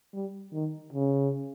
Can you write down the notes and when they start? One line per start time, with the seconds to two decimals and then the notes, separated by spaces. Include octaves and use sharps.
0.13 G3
0.53 D#3
0.93 C#3